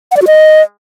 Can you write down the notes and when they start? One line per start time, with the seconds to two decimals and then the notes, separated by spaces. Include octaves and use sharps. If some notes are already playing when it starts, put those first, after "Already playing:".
0.11 F#5
0.17 D5
0.22 F#4
0.27 D#5